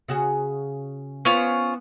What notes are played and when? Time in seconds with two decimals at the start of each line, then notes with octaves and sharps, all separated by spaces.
0.08 C#3 F#4 G#4
1.25 B3 C#4 F4 C5